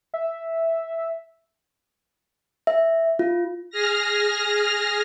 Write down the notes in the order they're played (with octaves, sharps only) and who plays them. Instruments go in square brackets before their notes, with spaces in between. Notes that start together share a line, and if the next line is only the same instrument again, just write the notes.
[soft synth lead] E5
[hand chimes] E5
F4
[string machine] G#4 F6 A#6